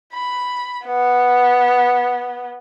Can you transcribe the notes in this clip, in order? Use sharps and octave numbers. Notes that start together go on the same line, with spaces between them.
B5
B3